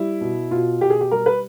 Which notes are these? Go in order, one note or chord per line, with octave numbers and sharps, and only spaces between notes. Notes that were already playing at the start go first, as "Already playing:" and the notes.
Already playing: G3 E4
B2
B2 F4
B2 G4
G#4
G4
G3 A#4
B4